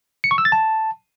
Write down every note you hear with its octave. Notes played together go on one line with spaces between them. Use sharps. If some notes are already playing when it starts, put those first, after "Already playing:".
C#7
C#6
E6
A6
A5